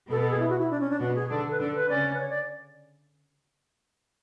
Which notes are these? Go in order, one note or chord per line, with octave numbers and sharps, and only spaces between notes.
B2 B3 A4
A4
G#4
E4
F#4
E4
D4
C#4
D4
B2 B3 F#4
G#4
D3 D4 A4
B4
D3 D4 A4
B4
C#3 C#4 D5
B4
C#5
D5